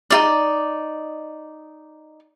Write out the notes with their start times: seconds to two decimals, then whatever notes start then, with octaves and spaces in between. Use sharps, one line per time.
0.10 D#4 F4 D5